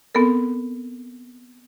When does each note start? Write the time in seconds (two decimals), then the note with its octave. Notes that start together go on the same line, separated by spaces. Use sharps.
0.15 B3 C4 A4 A#4